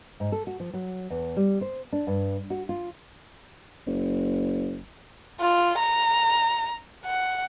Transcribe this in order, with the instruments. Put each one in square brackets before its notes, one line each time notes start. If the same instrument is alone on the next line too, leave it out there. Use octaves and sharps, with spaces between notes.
[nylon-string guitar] G#2
A4
F#4
F3
F#3
E2
G3
C5
D4
G2
F#4
F4
[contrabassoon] F#1
[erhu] F4
A#5
F#5